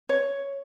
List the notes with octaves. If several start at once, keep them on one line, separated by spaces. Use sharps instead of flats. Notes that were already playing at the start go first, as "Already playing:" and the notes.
C#5